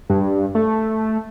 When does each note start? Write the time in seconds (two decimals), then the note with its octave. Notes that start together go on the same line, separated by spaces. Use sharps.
0.10 G2
0.55 A3